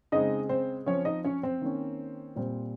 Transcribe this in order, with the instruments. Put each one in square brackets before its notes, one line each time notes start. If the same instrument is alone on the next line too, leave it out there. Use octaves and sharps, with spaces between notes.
[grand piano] C#3 G#3 C4 D#4 D#5
C4 C5
F3 C4 C#4 C#5
D#4 D#5
C#4 C#5
C4 C5
D#3 A#3 C#4
A#2 G3 C4